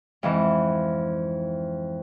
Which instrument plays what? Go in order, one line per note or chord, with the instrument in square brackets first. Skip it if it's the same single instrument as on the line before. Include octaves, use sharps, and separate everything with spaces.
[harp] F2 G#2 E3